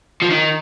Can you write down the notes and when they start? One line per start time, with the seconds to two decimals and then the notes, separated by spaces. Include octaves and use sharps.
0.22 F3
0.31 D#3